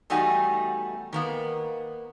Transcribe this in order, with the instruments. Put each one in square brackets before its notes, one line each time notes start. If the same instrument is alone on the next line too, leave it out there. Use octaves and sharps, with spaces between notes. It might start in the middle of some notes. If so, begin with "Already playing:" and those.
[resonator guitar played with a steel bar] E2 G3 A3 D#4 F#4 G#5
D#3 A#3 B3